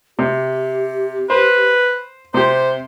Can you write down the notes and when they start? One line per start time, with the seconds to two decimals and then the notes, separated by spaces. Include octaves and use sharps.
0.19 C3 G4
1.30 B4 C5
2.34 C3 G4 C5 C6